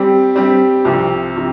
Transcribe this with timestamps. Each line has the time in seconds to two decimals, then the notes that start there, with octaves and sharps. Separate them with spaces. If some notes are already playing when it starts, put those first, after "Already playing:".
Already playing: G3 C4 G4
0.35 G3 C4 G4
0.85 C2 C3 F3 C4
1.36 C3 F3 C4